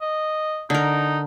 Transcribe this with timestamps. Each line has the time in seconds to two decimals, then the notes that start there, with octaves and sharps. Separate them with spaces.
0.01 D#5
0.70 D3 D#4 A#4